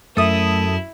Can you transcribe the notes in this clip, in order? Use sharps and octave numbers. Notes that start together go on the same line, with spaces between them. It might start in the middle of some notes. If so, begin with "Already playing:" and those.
F#2 A3 E4 A4 E5 D#6